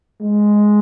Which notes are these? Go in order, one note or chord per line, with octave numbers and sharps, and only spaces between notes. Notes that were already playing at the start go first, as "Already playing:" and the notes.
G#3